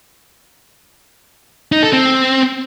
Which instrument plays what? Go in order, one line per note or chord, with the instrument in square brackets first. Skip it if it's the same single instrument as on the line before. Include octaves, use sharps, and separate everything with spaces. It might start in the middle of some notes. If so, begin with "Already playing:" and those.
[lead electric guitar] D#4
A4
C4